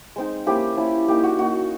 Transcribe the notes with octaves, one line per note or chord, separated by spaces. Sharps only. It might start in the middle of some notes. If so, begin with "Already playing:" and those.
G#3 C4 D#4
F3 A#3 C#4 E4 G4
F3 A#3 C#4 E4
A#3 D#4 G4
F#4
A#3 D#4 F#4